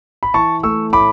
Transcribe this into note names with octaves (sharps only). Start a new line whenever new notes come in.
B5
E3 A5 C#6
A3 C#6 E6
A2 B5 D6